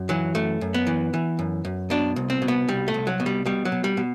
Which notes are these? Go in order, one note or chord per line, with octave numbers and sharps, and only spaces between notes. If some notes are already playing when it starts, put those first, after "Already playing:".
Already playing: F#2
E3 F#3
F#2 A3
F#2
B3
E3
E3
F#2
F#2
B2 D4
C2
C4
B2
B3
C2 G3
A3
C2
F#3
B2
G3
B2 G3
F#3
B2
G3
B2